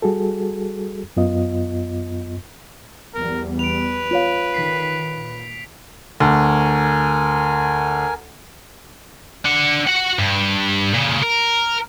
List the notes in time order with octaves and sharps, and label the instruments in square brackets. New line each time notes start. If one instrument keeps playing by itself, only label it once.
[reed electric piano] G3 F#4 G#4 A4
F#2 B3 F4 D#5
[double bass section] E2 G3 B3 [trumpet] A#4
[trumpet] B4 [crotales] D7 F7
[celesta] F4 C#5 F5
[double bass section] D3 D#3 [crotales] B6 C7
[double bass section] A#2
[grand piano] D2 [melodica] A#4 G#5
[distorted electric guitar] D4 F#5
F#4 F#5
G2
A#2 C#3
A#4